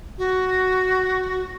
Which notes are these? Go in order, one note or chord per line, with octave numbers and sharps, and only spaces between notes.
F#4